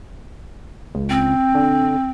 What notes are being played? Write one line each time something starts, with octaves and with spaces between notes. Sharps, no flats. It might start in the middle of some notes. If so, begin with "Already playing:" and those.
C#2
C4
D3